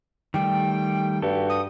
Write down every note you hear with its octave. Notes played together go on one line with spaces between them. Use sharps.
D#3 G3 A3 G5
G2 F#4 G4 A4
D#6